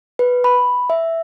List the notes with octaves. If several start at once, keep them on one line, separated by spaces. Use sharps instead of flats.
B4
B5
E5